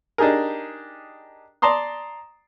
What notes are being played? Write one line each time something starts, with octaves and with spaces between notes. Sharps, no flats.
D4 D#4 G4 G#4 A#4
D5 A5 A#5 C6 D#6